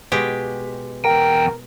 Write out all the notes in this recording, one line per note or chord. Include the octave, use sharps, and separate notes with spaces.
B2 G#3 G4
E2 A#4 G5